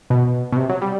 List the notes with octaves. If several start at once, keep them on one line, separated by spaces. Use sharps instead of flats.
B2
B2
C3
F#3
G3